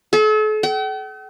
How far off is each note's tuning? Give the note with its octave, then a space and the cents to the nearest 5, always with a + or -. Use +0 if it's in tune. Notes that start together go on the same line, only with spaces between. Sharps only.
A4 -40
G5 -45